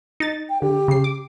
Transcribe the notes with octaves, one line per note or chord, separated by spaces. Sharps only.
D#4 A6
G5
D3 G4
C#3 C7
D6